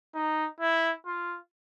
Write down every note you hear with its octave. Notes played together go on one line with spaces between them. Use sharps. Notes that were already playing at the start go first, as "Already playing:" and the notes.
D#4
E4
F4